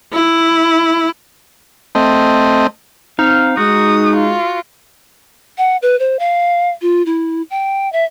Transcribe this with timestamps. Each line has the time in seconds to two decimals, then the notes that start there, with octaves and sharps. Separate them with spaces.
0.13 E4
1.95 A3 C4 D#5
3.19 C4 D#4 F5
3.57 G#3 F#4 D#6
4.16 F4
5.58 F#5
5.82 B4
5.99 C5
6.19 F5
6.82 F4
7.06 E4
7.50 G5
7.92 E5